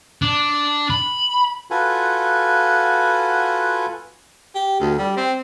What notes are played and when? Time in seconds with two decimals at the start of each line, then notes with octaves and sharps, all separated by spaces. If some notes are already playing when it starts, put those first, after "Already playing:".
0.22 D4
0.90 B5
1.71 F4 F#4 A4 B4 F#5 G#5
4.55 G4
4.80 D2
4.98 G3
5.17 C4